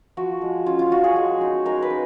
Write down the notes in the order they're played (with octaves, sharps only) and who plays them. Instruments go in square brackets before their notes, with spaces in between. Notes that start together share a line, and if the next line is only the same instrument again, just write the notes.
[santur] F3 F#4
G#3
C#4 F4
F4
F3 F#4
G#4
G#3
D#4
G#3 A#4
B4
D#4